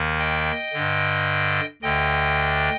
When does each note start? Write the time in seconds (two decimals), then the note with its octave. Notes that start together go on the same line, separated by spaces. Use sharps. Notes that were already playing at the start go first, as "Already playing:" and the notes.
Already playing: D#2 D#3
0.19 D#5 G5
0.73 G2 D3
1.82 D2 D3 D#5 G5